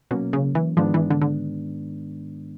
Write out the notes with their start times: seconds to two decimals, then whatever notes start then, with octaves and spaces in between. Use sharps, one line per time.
0.11 B2 F#3 A#3 C#4
0.33 C#3
0.55 E3
0.77 G#2 D#3 F3 G#3 B3 D4
0.94 E3
1.10 D3
1.22 D3